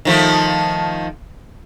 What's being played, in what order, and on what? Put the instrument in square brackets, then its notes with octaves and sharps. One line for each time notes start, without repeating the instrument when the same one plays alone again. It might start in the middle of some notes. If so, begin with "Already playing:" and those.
[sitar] D#3 F3 A3